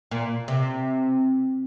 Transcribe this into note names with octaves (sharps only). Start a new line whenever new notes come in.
A#2
C3